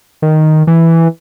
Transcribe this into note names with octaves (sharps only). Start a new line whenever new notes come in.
D#3
E3